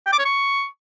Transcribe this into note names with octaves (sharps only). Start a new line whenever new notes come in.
G5
D6
C#5
C#6